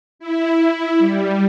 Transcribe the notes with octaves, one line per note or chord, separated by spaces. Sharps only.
E4
G3